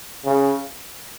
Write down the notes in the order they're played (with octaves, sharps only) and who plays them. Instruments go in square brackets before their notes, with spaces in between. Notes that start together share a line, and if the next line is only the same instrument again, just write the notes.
[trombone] C#3